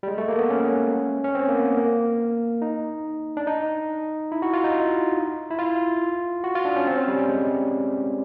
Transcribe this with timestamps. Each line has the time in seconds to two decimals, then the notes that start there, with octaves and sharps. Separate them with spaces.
0.03 G3
0.08 G#3
0.18 A3
0.28 A#3
0.39 B3
0.50 C#4
1.24 C#4
1.35 C4
1.49 A#3
1.55 B3
1.77 A#3
2.62 D#4
3.37 D4
3.47 D#4
4.32 E4
4.42 F#4
4.53 F4
4.64 D#4
5.51 E4
5.59 F4
6.44 F#4
6.55 F4
6.65 D4
6.76 C#4
6.87 C4
6.96 C#4
7.08 G3
7.18 G3
7.29 G#3